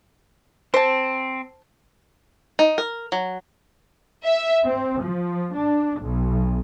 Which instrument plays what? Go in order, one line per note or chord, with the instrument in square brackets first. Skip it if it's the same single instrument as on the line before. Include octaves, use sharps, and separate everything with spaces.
[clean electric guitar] C4 [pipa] C5 A5
[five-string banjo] D#4
A#4
F#3
[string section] E5
C4
F3
D4
B1